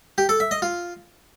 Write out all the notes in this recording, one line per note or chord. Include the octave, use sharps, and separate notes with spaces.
G4
A4
E5
D#5
F4